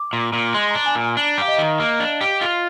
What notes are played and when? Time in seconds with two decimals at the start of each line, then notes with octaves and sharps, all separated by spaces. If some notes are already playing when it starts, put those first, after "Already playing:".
Already playing: D6
0.13 A#2
0.33 A#2
0.54 G#3 C6
0.70 D4 A#5
0.86 G#5
0.95 A#2
1.01 A#5
1.17 D4 A#5
1.38 G4 F5
1.48 D#5
1.58 D#3
1.80 A#3
2.00 D4
2.21 G4
2.41 F4